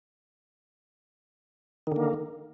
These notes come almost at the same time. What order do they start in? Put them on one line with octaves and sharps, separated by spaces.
D#3 D3 A#3